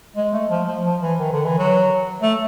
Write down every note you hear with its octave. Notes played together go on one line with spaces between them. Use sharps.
G#3
A3
F3
F3
F3
E3
D#3
D3
E3
F#3
A3